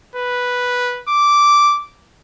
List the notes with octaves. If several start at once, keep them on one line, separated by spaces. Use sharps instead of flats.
B4
D6